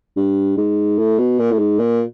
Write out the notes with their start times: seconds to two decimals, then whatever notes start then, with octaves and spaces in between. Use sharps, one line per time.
0.16 G2
0.57 G#2
0.98 A2
1.18 B2
1.39 A#2
1.52 A2
1.58 G#2
1.79 A#2